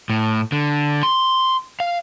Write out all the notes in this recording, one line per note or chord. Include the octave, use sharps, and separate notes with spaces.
A2
D3
C6
F5